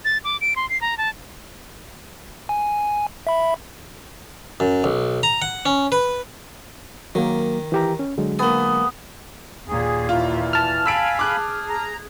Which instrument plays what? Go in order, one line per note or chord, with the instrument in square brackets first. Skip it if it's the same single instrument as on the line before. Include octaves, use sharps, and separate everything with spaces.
[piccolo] A6
D6
D7
C6
C7
A#5
A5
[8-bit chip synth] G#5
E5 B5
[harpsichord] F#2
B1
A#5
F#5
C#4
B4
[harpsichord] D#3 [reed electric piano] F#3 A#3
[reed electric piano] E3 G4 A#5
C#4
D3 F#3 G#3
[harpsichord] A#3 G#4 [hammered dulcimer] B3
[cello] D#2 A#2 [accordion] G#4
[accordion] E3 [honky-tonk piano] F4
[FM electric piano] A5 F6
[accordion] F5 G#5 B5 [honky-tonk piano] E6 B6 D7
[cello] G#4 [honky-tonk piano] D6 F#6
[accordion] A#5